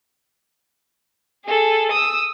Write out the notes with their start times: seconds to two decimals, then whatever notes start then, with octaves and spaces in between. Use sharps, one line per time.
1.46 G#4 A4
1.92 D#6 E6